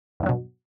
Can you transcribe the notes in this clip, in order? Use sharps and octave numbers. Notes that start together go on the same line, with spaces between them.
E2 G2 B2 F#3